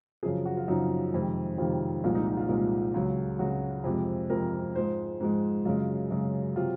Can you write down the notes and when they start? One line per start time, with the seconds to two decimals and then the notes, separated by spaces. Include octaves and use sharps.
0.23 F#2 C#3 F3 G#4
0.46 F#4
0.57 F4
0.68 F#2 C#3 F3 D#4
1.13 F2 C3 D#3 G#3
1.58 F2 C3 D#3 G#3 F4
2.04 C2 A#2 F3 G#3 F4
2.15 D#4
2.27 D#4
2.37 F4
2.49 C2 A#2 F3 G#3
2.94 C#2 C#3 F#3
3.39 C#2 C#3 F#3 F#4
3.84 F2 C3 F3 G#3
4.30 F2 C3 F3 G#3 A#4
4.75 G#2 F3 G#3 C5
5.20 G#2 F3 G#3
5.65 F#2 C#3 G#3 F4
6.10 F#2 C#3 G#3
6.56 C3 F#3 F4